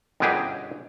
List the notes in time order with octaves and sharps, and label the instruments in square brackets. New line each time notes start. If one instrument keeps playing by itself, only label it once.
[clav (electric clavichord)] G1 F#2 B2 F#3 G4 G#4